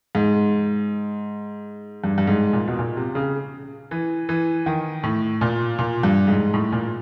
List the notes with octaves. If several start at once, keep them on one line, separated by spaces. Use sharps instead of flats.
G#2
G2
G2
G#2
A#2
B2
A#2
C3
C#3
E3
E3
D#3
A2
A#2
A#2
G2
G#2
A2
A#2